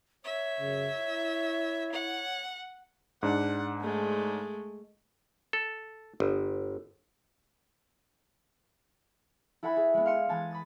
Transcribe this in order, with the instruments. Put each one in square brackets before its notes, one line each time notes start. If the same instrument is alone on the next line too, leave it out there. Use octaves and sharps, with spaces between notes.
[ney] C#5 [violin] E5
[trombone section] F#2 C#3
E4
[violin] F#5
[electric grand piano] G#2 D4 [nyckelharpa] F#5
[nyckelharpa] G#3 A3
[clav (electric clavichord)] A4
G1
[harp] E4 A4 E5 F#5 G#5 B5
G#4
G#3 B3
F5 C6 C#7 E7
E3 G#3 B3 G#5 A5
B5 D#6 A6